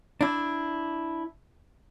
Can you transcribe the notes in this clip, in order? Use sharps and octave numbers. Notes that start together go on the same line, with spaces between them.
D4 E4